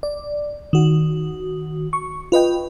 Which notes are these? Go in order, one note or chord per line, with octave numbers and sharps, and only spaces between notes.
D5
D#3 F#4
C#6
F4 B4 D#5 G5